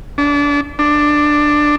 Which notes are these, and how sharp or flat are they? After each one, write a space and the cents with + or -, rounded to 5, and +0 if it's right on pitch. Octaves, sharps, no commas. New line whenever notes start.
D4 -30
D4 +10